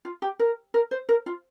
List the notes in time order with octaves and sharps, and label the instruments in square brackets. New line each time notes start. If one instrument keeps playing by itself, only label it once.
[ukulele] F4
G4
A#4
A#4
C5
A#4
F4